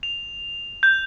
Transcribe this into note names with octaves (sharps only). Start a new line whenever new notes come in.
F7
G6